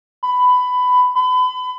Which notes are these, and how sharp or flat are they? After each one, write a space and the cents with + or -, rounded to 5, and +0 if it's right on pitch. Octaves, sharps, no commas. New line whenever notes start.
B5 +15
B5 +35